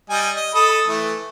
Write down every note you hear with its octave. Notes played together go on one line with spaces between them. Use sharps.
G3 D#5 G#5
D#5
A4 B5 D#6
E3 A3